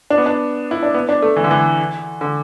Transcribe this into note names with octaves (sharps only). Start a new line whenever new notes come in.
D4
B3
D4
E4
D4
B3
D4
A3
E3
D3
E3
D3